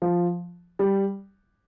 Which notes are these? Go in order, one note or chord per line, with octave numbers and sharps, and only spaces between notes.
F3
G3